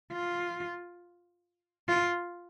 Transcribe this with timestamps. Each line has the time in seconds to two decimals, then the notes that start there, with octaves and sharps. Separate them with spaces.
0.12 F4
1.88 F4